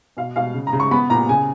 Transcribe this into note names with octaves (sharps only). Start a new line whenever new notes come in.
B2 F5
B2 F5
C#3
A#5
C#3
C#6
B3 B5
A#2 A#5
C#3 G#5